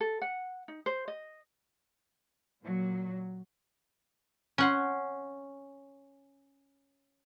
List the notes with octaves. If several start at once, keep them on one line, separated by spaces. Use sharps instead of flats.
A4
F#5
D#4
C5
D#5
A#2 F#3
C#4 F#5 C6